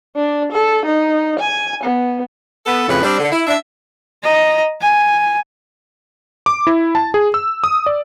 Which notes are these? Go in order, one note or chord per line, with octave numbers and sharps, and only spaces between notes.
D4
A4
D#4
G#5
B3
B3 A4
F2 A2 C#3 B4
G3 C4 D4
D3
E4
D4 E5
D#5 A#5
G#5
D6
E4
A5
G#4
E6
D#6
D5